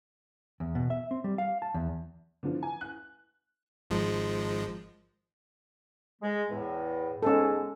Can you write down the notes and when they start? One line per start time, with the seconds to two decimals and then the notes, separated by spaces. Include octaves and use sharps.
0.60 E2
0.75 B2
0.90 E5
1.11 C4
1.24 G3
1.38 F5
1.62 A5
1.74 E2
2.43 D3 E3 F3
2.63 G#5
2.81 F#6
3.90 G#1 F3 G#3
6.22 G#3
6.50 E2 A2
7.23 G#2 G#3 B3 C#4 A4